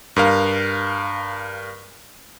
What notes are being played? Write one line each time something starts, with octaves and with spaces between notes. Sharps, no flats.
G2 A#4 F5